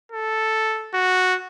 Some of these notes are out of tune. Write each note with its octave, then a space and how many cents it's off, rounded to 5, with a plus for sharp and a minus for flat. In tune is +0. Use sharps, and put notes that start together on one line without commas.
A4 +0
F#4 -5